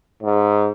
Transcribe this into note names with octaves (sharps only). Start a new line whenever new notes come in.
G#2